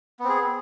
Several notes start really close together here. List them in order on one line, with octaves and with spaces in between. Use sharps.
B3 C4 G#4